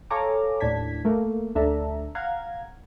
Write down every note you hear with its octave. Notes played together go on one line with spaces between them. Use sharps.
A4 C#5 F5 G#5 A#5 D6
D#2 A2 D4 A5 G#6 B6
A3 A#3
D2 D4 A4 E5 A5 A#5
F5 F#5 A#5 G#6